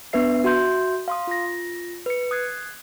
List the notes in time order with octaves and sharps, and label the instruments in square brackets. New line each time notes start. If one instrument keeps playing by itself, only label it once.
[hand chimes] B3 D4 B4 E5 C7
F#4 E5 C6 G6
F5 C6 D#6
F4 A#6
B4 C#7
D#6 F#6 G#6 C7